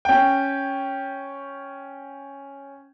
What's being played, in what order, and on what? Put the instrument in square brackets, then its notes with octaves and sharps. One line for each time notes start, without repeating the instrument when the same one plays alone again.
[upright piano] C#4 G5